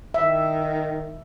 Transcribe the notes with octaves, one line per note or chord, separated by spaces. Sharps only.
D#3 E5